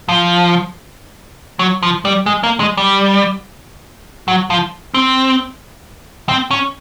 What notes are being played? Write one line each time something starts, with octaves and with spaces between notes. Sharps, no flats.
F3
F#3
F3
G3
G#3
A#3
G#3
G3
F#3
F3
C4
C4
C#4